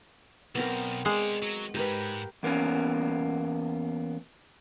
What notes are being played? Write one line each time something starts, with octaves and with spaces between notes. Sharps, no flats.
B1 B3 C4 A#4
G#3 C5 D5
F#3
G#2 G4 A#4 B4
E2 A#3 B3 C#4